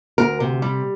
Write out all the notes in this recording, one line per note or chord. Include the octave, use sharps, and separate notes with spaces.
D2 A#4
C3
G3